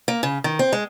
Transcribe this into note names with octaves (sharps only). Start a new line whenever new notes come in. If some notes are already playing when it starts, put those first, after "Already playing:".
A#3
C#3
D#3
C4
G#3